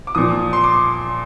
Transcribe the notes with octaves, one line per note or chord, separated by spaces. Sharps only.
D6
A#2 F3 D#6
C6
D6